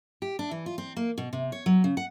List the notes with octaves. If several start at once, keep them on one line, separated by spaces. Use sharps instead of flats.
G4
D4
E3
F4
C4
A#3
B2
C3
C#5
F#3
C#3
F#5